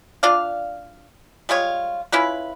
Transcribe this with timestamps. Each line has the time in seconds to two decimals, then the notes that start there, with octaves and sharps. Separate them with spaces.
0.23 D4 F4 D5 F5
1.49 G3 G#3 F4 C#5
2.12 C#4 E4 F4 B4